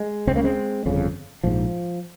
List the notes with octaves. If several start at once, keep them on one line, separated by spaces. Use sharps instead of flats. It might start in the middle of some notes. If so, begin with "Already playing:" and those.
Already playing: G#3
C#2 C#3 A#3 C4
G#3 C4
G1 F2 C#3
A#1 G#2 F3